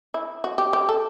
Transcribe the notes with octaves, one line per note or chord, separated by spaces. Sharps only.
E4
F#4
G4
G4
A4